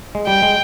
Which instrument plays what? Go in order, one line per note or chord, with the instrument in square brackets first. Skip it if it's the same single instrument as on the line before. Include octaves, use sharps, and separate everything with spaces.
[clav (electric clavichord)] G#3
[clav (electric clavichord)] G3 [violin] G5
[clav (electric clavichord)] G#3